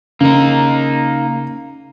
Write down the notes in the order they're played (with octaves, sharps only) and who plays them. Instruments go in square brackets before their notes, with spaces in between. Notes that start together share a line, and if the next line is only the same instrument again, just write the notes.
[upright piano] C#3 [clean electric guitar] A#3 D#4